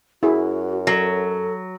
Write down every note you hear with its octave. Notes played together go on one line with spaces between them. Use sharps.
F#2 E4 F#4 G#4
F#3 A4